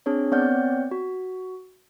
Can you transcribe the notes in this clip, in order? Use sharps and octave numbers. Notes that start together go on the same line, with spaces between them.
C4 D4 G#4 C#5
B3 C4 C#5 D5 F#5 G6
F#4